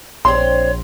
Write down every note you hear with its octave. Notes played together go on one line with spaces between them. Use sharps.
A#1 C4 D4 C#5 C6